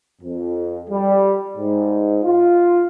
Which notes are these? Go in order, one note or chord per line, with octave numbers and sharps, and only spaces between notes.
F2
G3
G#2
F4